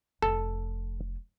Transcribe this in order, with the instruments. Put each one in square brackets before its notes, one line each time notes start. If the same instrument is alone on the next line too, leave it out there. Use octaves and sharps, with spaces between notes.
[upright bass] F1 [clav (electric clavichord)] A4